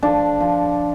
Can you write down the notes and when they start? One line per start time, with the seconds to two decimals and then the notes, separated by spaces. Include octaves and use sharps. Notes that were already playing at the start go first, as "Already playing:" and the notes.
0.03 F3 D4
0.41 F3